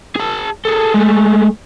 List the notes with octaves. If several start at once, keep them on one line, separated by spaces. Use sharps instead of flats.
G#4 A5
G#4 A4
G#3 A3